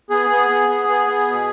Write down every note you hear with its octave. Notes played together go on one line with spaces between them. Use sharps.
B3 G#4
B3
B3
B3
B3
B3
B2